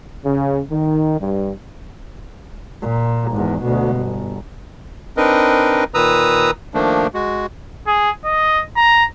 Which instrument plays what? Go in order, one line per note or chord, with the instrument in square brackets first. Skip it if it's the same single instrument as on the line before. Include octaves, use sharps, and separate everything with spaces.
[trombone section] C#3
D#3
G2
[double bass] A#2
G#1 E2
D2 B2
G1
[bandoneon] C4 D4 D#4 A#4 B4 D#5
A#2 D#3 B4 A#5 D#6 E6
D#3 F3 A3 A#3 D4
G#3 F#4
[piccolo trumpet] G#4
D#5
A#5